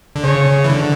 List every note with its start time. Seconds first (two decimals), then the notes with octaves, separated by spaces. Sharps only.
0.16 D3
0.23 C#3 C#5
0.64 E3
0.70 D3